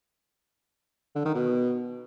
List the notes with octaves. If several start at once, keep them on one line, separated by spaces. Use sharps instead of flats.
D3
D#3
B2